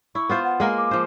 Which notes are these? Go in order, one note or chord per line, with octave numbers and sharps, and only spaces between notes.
E4 C#6
B3 F4 C5
F#5
G#3 A#3 A#4
D6
F3 C5